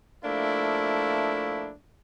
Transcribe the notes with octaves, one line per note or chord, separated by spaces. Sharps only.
F3 A3 A#3 D4 E4